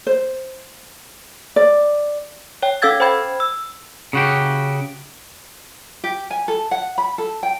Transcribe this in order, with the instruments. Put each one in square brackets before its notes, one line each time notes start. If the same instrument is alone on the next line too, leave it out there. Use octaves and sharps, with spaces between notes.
[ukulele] C5
D5
[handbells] C#5 G5
C#4 A4 F5 E6 G#6 A6
C5 G5 B5 G#6
E6
[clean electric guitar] C#3 F#4 G4
[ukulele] G4
G#5
A4
F#5
B5
A4
G5